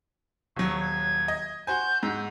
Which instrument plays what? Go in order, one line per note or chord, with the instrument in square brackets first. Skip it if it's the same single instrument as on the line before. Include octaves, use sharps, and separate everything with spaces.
[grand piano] D#1 F#3 [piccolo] C#6
[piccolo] G#6
[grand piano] D#5
[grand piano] F#4 C5 G#5 [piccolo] G6
[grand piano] G#2 F#4 [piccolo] E6